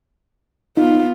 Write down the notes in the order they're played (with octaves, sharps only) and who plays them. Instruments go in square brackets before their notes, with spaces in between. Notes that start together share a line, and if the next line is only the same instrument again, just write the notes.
[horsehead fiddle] B3 F4 [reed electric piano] D#4